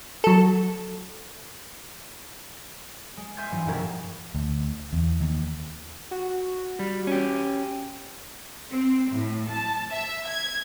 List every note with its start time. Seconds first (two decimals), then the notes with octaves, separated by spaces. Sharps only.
0.24 F#3 A4
3.17 G#3
3.37 E5 G#5 C6 F6 G6 G#6
3.51 G2 E3 F3
3.67 E1 G2 E4 A#4 G#6
4.35 D2
4.93 E2
5.21 D#2
6.11 F#4
6.79 G3
7.07 C#4 G4
8.70 C4
9.11 A2
9.49 A5
9.91 E5
10.27 G#6